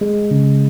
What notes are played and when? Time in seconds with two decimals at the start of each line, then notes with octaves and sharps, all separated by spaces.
0.01 G#3
0.31 C#3